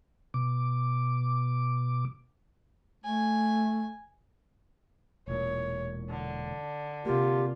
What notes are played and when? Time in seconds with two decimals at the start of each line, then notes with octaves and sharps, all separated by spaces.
0.34 B2 D6
3.04 A3 G#5
5.28 E1 A#2 C#5
6.10 D3
7.05 C3 A#3 F4 G4